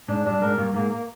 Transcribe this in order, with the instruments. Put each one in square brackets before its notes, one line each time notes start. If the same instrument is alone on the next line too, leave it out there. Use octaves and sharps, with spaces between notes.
[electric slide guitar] G#2 [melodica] D4
[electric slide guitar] G2 [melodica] D4
[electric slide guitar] G#2 [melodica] A#4
[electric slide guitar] G2 [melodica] A#3
[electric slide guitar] G#2 [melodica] A#3
[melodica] A#3